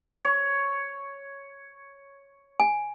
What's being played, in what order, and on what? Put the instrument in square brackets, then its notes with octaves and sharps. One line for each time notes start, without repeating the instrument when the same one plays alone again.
[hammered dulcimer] C#5
[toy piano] G#5